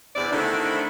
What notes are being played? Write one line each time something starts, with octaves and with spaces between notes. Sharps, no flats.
E2 C3 D5
D3 D#3 A3 C4 D4 E4